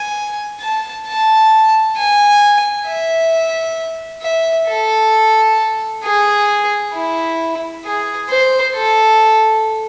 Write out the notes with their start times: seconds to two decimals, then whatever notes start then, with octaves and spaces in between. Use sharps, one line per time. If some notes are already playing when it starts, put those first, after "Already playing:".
Already playing: G#5
0.61 A5
1.07 A5
1.97 G#5
2.87 E5
4.22 E5
4.68 A4
6.04 G#4
6.94 E4
7.84 G#4
8.30 C5
8.74 A4